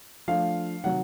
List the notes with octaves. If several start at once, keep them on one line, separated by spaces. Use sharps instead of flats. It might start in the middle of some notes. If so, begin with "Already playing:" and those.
F3 A3 D4 F5
C3 D#3 F#3 F#5